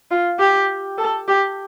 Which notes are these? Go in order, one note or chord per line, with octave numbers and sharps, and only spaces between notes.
F4
G4
A4
G4